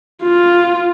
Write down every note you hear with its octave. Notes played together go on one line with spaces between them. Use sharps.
F4